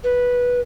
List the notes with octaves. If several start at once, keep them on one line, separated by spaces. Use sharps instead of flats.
B4